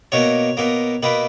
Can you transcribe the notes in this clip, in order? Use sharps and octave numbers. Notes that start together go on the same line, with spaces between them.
B2 A#3 C#5
B2 A#3
B2 A#3 B4